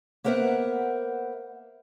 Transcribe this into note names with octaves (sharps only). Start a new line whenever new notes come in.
A#3 B3 A#4 C5 E5 F#5